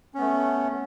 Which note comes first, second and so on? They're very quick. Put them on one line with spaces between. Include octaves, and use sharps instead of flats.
C#4 B3 A3